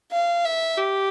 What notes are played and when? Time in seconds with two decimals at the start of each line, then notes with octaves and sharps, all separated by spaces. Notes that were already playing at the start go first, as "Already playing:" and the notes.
0.12 F5
0.45 E5
0.78 G4